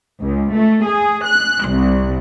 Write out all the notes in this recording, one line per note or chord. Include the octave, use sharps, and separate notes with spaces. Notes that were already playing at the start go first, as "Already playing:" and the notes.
C#2
A3
G#4
F#6
C2